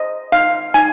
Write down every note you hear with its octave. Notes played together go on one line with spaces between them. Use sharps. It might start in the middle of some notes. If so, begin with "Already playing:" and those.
Already playing: C5 D#5
D#4 F5
D#4 G#5